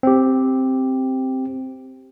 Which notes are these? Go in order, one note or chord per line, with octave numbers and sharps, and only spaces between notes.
C4 G4